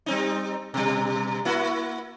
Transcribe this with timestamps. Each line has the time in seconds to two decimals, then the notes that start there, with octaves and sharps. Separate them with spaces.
0.06 G3 C4 D#4
0.74 B2 G3
1.45 A#3 E4 F#4